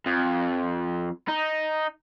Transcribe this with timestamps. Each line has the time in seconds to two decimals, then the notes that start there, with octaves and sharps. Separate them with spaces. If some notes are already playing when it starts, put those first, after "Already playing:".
0.06 F2
1.28 D#4